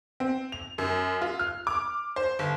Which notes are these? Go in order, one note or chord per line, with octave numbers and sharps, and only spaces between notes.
C4
F7
F#2
F4
F6
D6
C5
G1